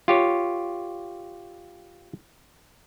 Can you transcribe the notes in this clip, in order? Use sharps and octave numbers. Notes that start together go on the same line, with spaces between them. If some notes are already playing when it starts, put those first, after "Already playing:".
F4 G4 C#5